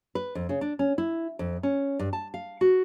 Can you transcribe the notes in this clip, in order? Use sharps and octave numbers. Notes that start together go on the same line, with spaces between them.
B4
F2
C#3
D4
C#4
E4
F2
C#4
G2
A5
F5
F#4